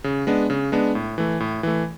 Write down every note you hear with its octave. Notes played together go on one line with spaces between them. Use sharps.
C#3
G#3 B3 D4
C#3
G#3 B3 D4
A2
E3 A3
A2
E3 A3